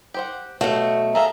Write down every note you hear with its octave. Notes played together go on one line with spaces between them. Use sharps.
G4 C5 F#5
B2 F#3 A3 F#4 F5 G5
G#4 A4 E5 F5 A#5